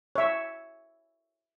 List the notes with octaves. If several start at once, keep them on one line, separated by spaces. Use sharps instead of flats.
C#5 E5